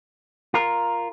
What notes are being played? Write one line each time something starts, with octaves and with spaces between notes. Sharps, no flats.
F4 A#4